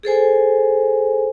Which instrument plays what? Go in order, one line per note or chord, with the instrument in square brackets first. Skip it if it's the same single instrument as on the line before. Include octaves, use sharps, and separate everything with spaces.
[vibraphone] G#4 A4 C5 G#5